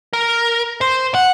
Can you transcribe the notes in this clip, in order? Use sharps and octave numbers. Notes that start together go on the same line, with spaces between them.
A#4
C5
F#5